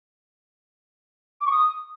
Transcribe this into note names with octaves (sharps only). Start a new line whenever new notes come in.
D6
C#6
D#6